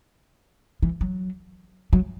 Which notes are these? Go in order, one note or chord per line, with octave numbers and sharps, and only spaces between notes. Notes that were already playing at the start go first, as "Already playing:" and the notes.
E3
F#3
F#3